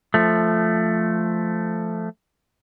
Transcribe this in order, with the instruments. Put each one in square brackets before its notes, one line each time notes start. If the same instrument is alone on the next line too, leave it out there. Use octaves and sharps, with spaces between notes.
[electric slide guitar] F3 A3